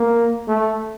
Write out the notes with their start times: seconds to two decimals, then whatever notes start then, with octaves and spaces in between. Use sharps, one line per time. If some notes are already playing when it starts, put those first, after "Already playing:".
Already playing: A#3
0.48 A3